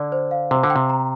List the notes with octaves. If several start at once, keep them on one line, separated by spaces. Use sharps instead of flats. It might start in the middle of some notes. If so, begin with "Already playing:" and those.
Already playing: D3 D5
C5
F5
C3 C5
D3
G5
C3
A#5